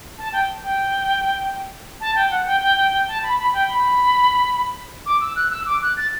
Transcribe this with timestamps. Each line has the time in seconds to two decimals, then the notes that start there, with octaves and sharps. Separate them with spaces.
0.18 A5
0.32 G5
0.63 G5
2.01 A5
2.15 G5
2.31 F#5
2.46 G5
2.62 G5
2.76 G5
2.92 G5
3.08 A5
3.23 B5
3.38 B5
3.53 G5
3.68 B5
5.06 D6
5.21 E6
5.36 F#6
5.51 E6
5.66 D6
5.82 F#6
5.97 A6